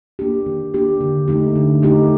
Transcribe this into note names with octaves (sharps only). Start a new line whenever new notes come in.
A#3 D4 G4
D#3
A#3 D4 G4
D3
A3 D#4 G4
D3
A3 D#4 G4